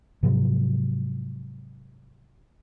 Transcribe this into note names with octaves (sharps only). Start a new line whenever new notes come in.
G#2 C3 F3 F#3